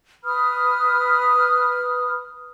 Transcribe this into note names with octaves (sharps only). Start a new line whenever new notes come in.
B4 B5 D#6 F6